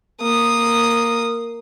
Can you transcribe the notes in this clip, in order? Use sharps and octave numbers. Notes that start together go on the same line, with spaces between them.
A#3 D#6